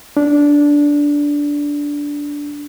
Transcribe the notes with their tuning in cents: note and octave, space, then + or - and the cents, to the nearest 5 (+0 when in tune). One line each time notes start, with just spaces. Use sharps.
D4 -10